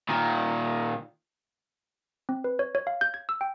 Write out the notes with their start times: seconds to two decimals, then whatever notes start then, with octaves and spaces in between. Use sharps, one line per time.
0.09 A#2 D#3
2.29 C4
2.44 B4
2.59 C#5
2.75 C#5
2.87 F5
3.01 G6
3.14 G#6
3.29 E6
3.41 G5